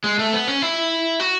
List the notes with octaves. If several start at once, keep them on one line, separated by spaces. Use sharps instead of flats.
G#3
A3
B3
C#4
E4
F#4